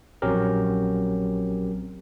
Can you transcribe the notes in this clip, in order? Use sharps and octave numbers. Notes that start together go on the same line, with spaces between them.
A#1 F#3 C4 C#4 G4 A#4